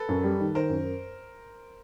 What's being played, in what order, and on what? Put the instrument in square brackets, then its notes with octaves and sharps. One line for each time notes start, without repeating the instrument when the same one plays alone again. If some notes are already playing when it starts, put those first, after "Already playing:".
Already playing: [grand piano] A4 B4
[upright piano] F#2
G3
D#3
[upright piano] D#3 [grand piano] A#4 C5
[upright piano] F#2